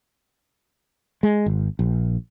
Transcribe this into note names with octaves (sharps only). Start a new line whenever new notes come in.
G#3
G#1
A#1